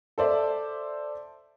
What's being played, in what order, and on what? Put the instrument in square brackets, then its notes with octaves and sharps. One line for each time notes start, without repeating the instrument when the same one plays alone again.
[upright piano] A4 C5 D5 E5